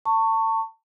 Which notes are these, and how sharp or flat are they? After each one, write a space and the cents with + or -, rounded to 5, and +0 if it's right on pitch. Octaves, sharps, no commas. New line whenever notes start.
A5 +30 C#6 +0